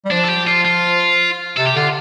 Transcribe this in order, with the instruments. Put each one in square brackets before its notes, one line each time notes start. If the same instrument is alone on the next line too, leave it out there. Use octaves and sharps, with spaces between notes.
[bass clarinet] G3
[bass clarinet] F3 [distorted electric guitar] D4
[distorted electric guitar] A4
G4
F4
F4
[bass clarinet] C3 [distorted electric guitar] A4
[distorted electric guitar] G4
[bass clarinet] D3 [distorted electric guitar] F4